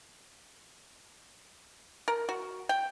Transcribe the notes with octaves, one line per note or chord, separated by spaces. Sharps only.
A#4
F#4
G5